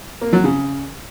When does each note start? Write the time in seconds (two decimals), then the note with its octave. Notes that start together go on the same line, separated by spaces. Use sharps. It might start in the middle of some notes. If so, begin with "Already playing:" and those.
0.21 A#3
0.33 F#3
0.44 C#3